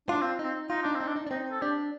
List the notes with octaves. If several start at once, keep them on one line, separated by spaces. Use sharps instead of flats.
D4 F4
C4
C4 D#4
D#4 F4
D4 D#4
C4
D#4
D4
D#4
D4
C4 D#4
A4
D4 G4